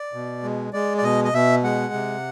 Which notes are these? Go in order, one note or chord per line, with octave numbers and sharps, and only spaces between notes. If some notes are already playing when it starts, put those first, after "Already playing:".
Already playing: D5
B2
G#3
G#3 D5
D5
B2 D#5
D#5
B2 E5
G#3 F#5
C3